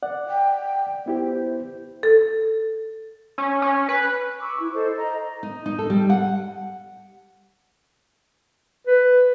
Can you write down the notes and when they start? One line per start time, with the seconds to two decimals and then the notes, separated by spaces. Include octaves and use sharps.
0.03 D5 F#5
0.28 G5
1.06 B3 E4 G4 C5
2.03 A4
3.38 C#4
3.62 C#4
3.89 B4
4.41 C#6 D6 E6
4.58 E4
4.74 A4 C5 D#5
4.96 D#5 A#5
5.43 D#4
5.66 D#4
5.79 A4
5.90 G3
6.10 F#5
8.87 B4